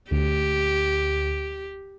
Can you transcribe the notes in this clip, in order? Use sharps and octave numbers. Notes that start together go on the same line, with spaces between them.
D2 G4